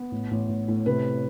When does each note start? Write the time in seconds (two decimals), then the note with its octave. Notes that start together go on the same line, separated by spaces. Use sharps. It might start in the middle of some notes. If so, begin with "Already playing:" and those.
Already playing: B3
0.11 A1
0.31 A1
0.49 A1
0.68 A2
0.86 C3 B4